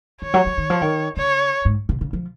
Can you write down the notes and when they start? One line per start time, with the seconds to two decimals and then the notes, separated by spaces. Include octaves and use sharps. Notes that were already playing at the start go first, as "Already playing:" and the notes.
0.22 D#3 C#5
0.34 F#3
0.46 F#3
0.58 D#3
0.70 F3
0.82 D#3
1.17 C#3 C#5
1.65 G#2
1.89 C3
2.01 C#3
2.13 F3